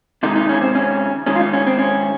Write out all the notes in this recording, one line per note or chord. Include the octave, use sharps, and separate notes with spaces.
C3 D#3 G#3 D#4
D#4
C#4
C4
C#4
D#3 G#3 C#4
F4
D#4
C#4
C4
C#4